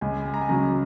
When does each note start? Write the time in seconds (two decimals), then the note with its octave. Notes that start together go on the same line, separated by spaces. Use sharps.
0.01 C#2 G#5
0.26 G#5
0.34 A#5
0.41 G#5
0.49 C#3 F#3 A#5